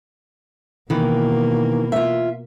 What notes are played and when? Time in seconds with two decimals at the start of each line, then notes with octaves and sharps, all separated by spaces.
0.90 B2 D#3 E3 A#3
1.92 F4 E5